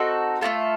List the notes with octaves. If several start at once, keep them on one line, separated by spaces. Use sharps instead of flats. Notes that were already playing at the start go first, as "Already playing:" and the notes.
Already playing: C4 D#4 F#4 A4
A3 C#4 F4 A4